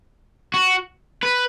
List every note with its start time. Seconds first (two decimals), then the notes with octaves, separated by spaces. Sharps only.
0.54 F#4
1.23 B4